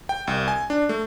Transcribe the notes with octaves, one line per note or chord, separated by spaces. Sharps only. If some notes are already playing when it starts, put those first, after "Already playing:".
G5
C2
G#5
D4
A3